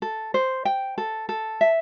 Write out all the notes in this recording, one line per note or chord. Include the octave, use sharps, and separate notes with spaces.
A4
C5
G5
A4
A4
E5